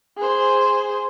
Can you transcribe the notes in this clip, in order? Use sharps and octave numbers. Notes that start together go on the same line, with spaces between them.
G#4 C5